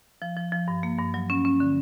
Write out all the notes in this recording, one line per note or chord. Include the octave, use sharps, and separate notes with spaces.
F3
F3
F3
G2
A#3
G2
F#3
C#4
C#4
D3